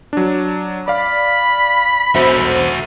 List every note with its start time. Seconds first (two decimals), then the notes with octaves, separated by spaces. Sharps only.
0.13 F#3 D4
0.88 D5 F5 B5
2.15 B1 F#4 C5 E5